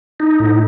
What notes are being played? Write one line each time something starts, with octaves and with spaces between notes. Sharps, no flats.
D#4
A2